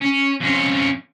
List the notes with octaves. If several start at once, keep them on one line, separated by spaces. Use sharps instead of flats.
C#4
F2 C#4